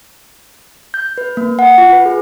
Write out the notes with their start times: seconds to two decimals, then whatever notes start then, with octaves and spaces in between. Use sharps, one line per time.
0.94 G6
1.18 B4
1.37 A#3
1.59 F#5
1.78 F4
1.92 B4
2.06 G#4